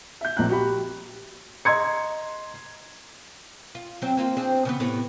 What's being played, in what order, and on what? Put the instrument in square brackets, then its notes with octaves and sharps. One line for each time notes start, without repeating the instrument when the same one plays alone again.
[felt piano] E5 G6
A#1 A#2 C4 A#5 F#6
F#4 G4 B5
G4
D#5 A#5 C6 G#6 C#7
[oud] F4
F#3 C4
A#3 C4 F4
C4 D4 G#4
C#3 E3 B3
A2 C3 B3